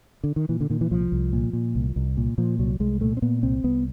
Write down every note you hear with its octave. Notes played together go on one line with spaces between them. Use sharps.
D3
D#3
A#2 E3
D3
A#2 D#3
E3
C2 F3
C2
A#2
A#2
C2
C2
A#2
A#2 F3
C2 F#3
C2 G#3
A#2 A3
C4
A#2 B3
C2 C4
C2 B3